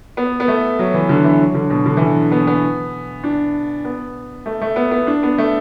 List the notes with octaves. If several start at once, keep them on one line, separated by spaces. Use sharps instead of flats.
B3
B3
A3
F#3
E3
D3
E3
F#3
D3
B2
D3
E3
D3
B3
B3
D4
B3
A3
A3
B3
B3
D4
B3
A3